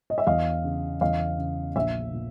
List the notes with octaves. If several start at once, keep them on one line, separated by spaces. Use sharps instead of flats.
D#5
E5
E2 D#5 F5
C#3
E2 D#5 F5
C#3
A#1 E5
A#2